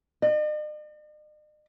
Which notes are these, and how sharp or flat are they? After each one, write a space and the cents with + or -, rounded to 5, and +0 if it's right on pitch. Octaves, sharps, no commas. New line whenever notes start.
D#5 -45